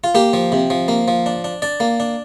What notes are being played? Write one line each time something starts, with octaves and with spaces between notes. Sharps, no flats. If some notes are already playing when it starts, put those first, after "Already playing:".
F4
A#3 G4
F3
C3
F3
A#3
F3
D4
D4
D4 D5
A#3
D4